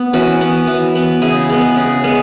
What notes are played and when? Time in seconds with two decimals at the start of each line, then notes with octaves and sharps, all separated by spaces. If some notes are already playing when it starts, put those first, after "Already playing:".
Already playing: B3
0.13 E3 C#4 F#4
0.41 B3
0.67 E3
0.95 B3
1.22 C#3 E4 G#4
1.49 G#3 B3
1.77 C#3
2.04 G#3 B3